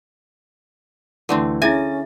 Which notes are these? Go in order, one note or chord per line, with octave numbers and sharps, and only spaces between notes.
D2 D3 E3 A3 C4
C#4 E4 G#4 E5 G#5 A6